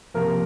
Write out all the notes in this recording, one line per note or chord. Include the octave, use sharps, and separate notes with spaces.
C3 F3 A#3 A#4